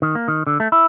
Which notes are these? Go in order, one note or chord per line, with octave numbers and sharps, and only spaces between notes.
D#3
A#3
D#3
D3
A3
E4